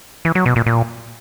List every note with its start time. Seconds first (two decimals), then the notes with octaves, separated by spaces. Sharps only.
0.25 E3
0.35 F#3
0.46 B2
0.56 A#2
0.66 A#2